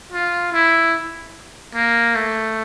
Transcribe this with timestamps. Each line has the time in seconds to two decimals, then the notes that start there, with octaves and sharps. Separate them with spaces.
0.12 F4
0.53 E4
1.75 A#3
2.15 A3